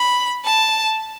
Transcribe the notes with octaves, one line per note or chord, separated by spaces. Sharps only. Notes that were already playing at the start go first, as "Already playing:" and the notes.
Already playing: B5
A5